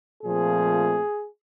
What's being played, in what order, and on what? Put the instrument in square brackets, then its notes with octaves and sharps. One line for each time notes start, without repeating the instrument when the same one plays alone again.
[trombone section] A#2 F3 A3 C4 G#4